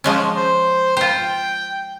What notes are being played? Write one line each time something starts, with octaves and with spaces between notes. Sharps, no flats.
F3 G#3 C#4
C5
F4 C5 G5